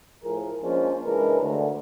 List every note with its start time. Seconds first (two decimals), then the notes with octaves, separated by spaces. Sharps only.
0.24 A2 F3 G#4 A#4
0.63 F3 G#3 A#3 C#4 D4 F4
1.05 C#3 E3 G#3 D4 A#4 B4
1.41 D2